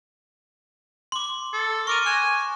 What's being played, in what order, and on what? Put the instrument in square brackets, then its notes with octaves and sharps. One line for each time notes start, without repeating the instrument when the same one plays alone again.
[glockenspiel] C6 D6
[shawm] A4
[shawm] A#4 [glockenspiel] C#6 D6 D#7
[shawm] G#5 [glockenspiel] F#6 E7